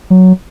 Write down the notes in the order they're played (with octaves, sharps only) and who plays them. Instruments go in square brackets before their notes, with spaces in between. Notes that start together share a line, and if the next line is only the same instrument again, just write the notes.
[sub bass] F#3